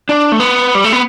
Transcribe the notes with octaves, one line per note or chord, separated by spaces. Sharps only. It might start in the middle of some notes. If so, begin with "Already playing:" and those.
D4
A3
B3
G3
A3
B3